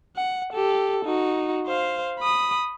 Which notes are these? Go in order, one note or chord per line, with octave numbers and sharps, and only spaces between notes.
F#5
G4 A4
D#4 F#4
C5 F5
B5 D#6